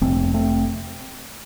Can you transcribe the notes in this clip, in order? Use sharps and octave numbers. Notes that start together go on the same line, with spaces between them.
F1 F2 C3 A3 C4
A3 C4